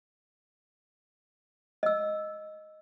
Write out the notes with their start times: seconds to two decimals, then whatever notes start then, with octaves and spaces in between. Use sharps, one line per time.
1.83 D#5 E6